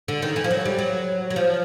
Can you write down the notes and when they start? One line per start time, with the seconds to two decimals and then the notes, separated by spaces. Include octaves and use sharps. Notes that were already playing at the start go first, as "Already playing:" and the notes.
0.08 D3
0.22 D#3
0.36 E3
0.44 F3
0.51 F#3
0.65 G3
0.79 F#3
1.30 F#3
1.36 F3